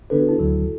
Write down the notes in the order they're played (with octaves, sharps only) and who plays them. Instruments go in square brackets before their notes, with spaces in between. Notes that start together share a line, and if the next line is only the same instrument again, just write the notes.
[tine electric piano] D3 B3 D4 B4 [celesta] A4
[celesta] F#4
E4
[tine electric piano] D2 D3 F#3